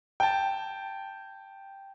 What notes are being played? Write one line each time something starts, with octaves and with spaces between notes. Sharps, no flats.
G5 A5